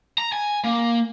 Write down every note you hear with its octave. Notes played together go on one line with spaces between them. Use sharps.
A#5
G#5
A#3